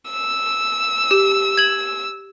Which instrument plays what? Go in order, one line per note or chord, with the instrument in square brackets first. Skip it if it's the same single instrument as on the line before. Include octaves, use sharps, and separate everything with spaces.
[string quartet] E6
[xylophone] G4
G#6 F#7